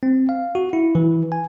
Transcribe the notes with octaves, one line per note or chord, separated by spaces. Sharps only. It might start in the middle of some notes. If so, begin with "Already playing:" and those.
C4
F5
F#4
E4
E3
G#5